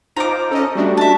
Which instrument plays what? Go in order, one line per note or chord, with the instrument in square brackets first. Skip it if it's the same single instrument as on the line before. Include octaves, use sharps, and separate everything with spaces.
[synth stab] D#4 F4 [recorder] C5 [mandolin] A#5 D6
[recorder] C#4 [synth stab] A4 D#5
[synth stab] G3 A3 D4 [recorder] F#4
[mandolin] E5 A5